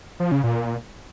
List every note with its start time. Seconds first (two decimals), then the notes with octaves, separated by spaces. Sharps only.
0.20 F3
0.32 C#3
0.44 A#2